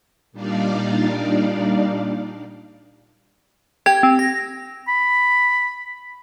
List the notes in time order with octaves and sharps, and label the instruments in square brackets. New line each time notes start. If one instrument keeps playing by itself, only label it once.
[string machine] A#2 G3 D4 D#4 D5 F5
[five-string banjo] G4 [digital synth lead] G#6
[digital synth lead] C4
A#6
[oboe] B5